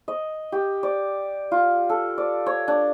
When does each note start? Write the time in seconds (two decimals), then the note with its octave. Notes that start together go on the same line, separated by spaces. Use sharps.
0.08 D#5
0.52 G4
0.83 D5
1.52 F4
1.89 A4
2.18 D5
2.46 C#5
2.68 D4